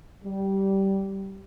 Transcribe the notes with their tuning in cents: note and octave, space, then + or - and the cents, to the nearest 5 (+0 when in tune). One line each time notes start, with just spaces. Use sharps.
G3 -15